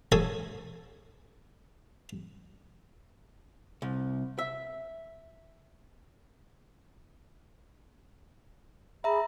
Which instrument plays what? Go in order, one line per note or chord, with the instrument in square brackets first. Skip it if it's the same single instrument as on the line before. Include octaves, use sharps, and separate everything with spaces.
[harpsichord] G#4 A4 C#5 G#5
[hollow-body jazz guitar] C2
E5
[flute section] G#4 B5 [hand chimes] E5 A#5